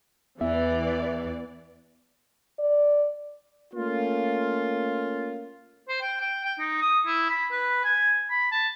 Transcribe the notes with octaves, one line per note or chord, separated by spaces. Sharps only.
E2 E3 B3 D5 E5
D5
A3 A#3 C#4 F4
C5
G5
G5
G5
D#4
D#6
E4
B5
B4
G#5
B5
A5